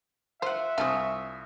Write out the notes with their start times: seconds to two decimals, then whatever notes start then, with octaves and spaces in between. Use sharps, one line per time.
0.42 F4 C5 E5 F#5
0.78 C2 F3 D4 F4 C#5 G#5 D#6